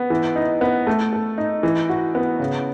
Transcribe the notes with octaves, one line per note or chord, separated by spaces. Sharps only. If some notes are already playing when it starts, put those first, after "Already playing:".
Already playing: B3
E3
D#4
B3
A3
A4
D#4
E3
F#4
B3
C#3